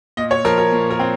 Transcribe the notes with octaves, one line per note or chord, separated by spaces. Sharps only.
A#2 D#5
C#5
F3 A#4
A#4
A#2
A#4
C4